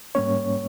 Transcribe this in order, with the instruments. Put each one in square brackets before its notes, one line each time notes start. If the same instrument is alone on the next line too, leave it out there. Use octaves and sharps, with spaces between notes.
[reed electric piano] G#2 G3 A#3 C#4 C#5